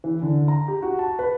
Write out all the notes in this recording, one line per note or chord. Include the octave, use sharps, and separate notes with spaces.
E3
D3
A#5
G4
F#4
A5
B4